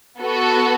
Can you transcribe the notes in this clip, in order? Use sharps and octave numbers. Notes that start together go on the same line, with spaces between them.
B3 F#4 A4